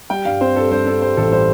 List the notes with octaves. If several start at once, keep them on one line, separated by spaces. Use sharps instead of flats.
G3 G5
G2 F5
C4 C5
G2 A4
G2 C5
C4 A4
G3 C5
A1 A4
G3 C5